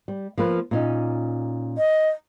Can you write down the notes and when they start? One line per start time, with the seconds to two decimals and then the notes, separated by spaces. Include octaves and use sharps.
0.08 G3
0.38 F3 A#3 B4
0.71 A#2 C#4 D#4
1.78 D#5